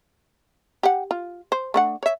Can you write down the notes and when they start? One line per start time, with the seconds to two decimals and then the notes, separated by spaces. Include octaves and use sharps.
0.83 G4 F#5
1.11 F4
1.52 C5
1.74 A3 D4 F#5
2.03 C#5 E5